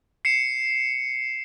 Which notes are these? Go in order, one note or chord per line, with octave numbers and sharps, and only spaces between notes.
C7 C#7 E7